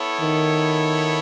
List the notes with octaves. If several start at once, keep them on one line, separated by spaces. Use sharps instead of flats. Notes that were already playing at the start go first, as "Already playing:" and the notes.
Already playing: B3 E4 A4 C#5
D#3